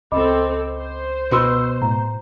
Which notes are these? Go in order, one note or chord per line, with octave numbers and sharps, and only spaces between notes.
C#2 C4 A4 D#5 B5 D6
C5
B2 F#4 B4 B5 C6 E6
A2 A#5